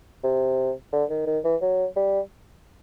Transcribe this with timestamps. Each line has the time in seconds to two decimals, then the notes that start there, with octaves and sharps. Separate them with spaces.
0.23 C3
0.92 D3
1.10 D#3
1.27 D#3
1.44 E3
1.61 F#3
1.96 G3